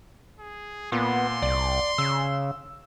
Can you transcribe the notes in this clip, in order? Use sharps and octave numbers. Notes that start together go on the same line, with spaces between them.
G#4
A#2 B3 C6
C2 D5
C#3 E6